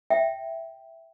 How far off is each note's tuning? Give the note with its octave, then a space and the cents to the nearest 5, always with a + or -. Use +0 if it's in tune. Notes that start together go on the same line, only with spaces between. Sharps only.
E5 +0 G5 +0